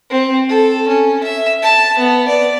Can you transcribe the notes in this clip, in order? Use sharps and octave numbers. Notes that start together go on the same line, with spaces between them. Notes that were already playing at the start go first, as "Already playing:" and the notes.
C4
A4
C#4
E5
A5
B3
D5